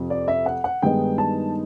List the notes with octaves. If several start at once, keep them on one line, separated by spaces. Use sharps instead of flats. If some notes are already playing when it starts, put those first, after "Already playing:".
Already playing: F2 C3 F3
D5
E5
F#5
F#5
G2 D#3 G#3 B3 D#4 G5
A5